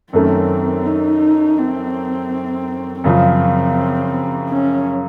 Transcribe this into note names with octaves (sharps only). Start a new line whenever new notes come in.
F#2 D#3 A3 C4 C#4
D#4
C4
F#2 C#3 F3 C4
C#4